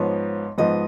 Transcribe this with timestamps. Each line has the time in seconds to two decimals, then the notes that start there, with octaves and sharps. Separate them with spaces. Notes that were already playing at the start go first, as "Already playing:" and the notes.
Already playing: G#2 F3 B3 C#5
0.58 G#2 F3 B3 D#5